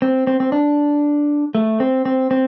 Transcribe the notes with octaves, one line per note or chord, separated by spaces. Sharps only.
C4
C4
C4
D4
A3
C4
C4
C4